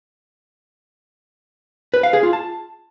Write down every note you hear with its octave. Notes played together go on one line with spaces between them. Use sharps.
B4
F5
G#4
F4
A5